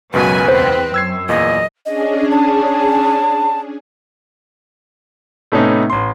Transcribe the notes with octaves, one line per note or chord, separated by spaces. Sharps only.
C#2 F#2 B2 F#3 B4 G#5
E2 C4 C5
F#2 E6 G#6 C7
E2 A#2 D#5
C#4 D4 G#4 D#5
A5
A2 C3 A3 B3 C#4 D#4
A1 C6